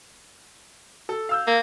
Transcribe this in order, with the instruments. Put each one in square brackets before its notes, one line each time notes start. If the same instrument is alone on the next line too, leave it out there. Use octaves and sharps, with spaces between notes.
[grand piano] A4
F5 E6 G6
[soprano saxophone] A#3